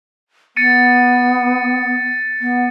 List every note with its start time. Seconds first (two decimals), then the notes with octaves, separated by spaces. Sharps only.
0.56 B3 A6 C#7 D#7
2.41 B3